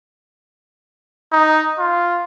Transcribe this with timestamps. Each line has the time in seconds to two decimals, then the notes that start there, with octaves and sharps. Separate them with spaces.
1.32 D#4
1.78 F4